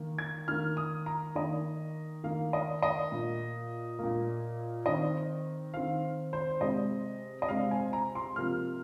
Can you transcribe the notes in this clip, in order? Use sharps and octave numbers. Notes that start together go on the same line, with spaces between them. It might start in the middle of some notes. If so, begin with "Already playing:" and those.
Already playing: D#3 A#3
G#6
D#3 A#3 F6
D#6
A#5
D#3 A#3 D#5
D#3 A#3 F5
D#5
D#5
A#2 A#3
A#2 A#3
D#3 C4 D#5
D#3 C4 F5
C5
C3 G#3 C4 D#5
D#5
C3 G#3 C4 F5
G#5
A#5
C6
C3 F3 A#3 F6